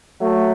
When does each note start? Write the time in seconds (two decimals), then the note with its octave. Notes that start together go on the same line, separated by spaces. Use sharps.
0.21 F#3 A3